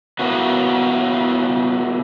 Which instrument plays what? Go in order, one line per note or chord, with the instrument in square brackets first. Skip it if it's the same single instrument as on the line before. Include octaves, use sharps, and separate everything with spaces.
[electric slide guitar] A2 E3 A#3 B3 F#4